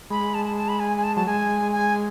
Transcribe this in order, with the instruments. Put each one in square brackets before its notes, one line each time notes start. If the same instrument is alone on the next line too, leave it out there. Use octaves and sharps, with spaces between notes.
[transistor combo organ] G#3 [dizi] B5
[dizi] A5
A5
A5
B5
G#5
G#5
A5
[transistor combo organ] F#3 [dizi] A5
[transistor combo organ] G#3 [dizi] G#5
[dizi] G#5